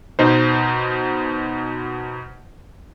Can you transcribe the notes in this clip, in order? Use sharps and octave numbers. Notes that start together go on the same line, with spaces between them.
B2 D#4 C5